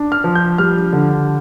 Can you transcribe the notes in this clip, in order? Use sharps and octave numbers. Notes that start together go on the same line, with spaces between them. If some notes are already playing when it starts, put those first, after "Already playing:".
Already playing: D4
F6
F3
G6
G3 F6
D3